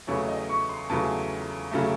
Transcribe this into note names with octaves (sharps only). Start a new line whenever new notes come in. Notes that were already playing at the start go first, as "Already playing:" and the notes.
E2 C#3 F#3 A3 C#5
D#5
C#6
C6
E2 C#3 F#3 A3 A5
C#3 F#3 A3